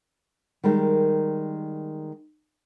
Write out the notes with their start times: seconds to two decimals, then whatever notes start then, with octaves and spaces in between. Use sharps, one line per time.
0.64 D#3 G3 G#3 A#4